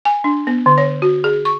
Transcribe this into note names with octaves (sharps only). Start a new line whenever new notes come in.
G#5
D4
B3
D3
C#5
F#4
G#4
C#6